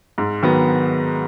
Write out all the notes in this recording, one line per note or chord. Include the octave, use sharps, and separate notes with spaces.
G#2
D#3 F#3 B3